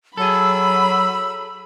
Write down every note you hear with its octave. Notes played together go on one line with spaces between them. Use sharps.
F#3 G#4 A4 B5 E6